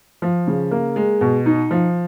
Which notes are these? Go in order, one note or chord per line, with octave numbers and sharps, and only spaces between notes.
F3
C#3
A#3
G#3
B2
D#4
F3